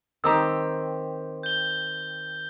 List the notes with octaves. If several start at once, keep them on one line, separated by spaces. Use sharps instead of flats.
D#3 C4 G4 A#5 D#6 E6
G6 G7